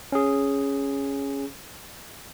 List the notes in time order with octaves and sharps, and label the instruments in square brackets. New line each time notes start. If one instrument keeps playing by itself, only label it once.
[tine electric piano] C#4 G#4